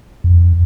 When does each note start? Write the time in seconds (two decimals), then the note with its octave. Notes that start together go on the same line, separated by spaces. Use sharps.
0.24 F2